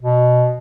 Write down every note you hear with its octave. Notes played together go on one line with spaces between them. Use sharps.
B2